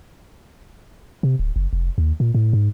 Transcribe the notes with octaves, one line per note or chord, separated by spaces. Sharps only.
C3
D1
F#1
F1
D#2
A#2
A2
G#2